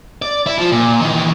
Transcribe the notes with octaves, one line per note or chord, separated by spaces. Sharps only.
D5
E4
F3
A#2
D#3 E3